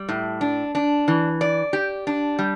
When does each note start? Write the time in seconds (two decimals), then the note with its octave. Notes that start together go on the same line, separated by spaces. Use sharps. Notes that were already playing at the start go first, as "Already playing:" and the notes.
Already playing: G3
0.09 A2
0.41 D4
0.75 D4
1.08 E3
1.41 D5
1.73 G4
2.07 D4
2.39 G3